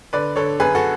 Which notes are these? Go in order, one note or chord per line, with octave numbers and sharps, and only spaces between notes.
D3 B4 D5
D3 A4 C#5
F#2 G#4 B4
F#4 A4